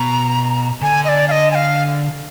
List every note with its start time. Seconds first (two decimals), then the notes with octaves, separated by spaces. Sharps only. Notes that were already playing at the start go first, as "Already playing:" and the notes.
Already playing: B2 A#5
0.82 D3 G#5
1.05 D#5
1.09 D5
1.28 F5
1.31 D#5
1.51 G#5
1.55 F5